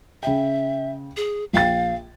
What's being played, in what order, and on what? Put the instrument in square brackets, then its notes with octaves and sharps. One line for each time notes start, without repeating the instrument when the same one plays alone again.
[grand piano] C#3 G5 [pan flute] E5
[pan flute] G#4
[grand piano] A#1 G5 A6 [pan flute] F5